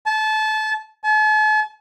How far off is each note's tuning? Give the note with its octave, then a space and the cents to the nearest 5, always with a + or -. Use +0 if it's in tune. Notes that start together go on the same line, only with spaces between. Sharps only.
A5 -25
A5 -45